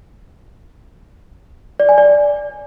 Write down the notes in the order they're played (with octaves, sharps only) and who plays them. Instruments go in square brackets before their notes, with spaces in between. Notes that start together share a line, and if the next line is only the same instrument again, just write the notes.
[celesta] D5
G#5
D5